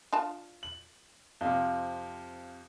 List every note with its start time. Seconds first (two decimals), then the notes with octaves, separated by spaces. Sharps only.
0.13 D4 F4 A5
0.63 F#7
1.41 F2 C3 F5